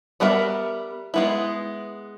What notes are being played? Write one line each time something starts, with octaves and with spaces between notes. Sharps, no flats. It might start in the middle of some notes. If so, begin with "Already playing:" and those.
G3 B3 A#4 E5
G#3 B3 E4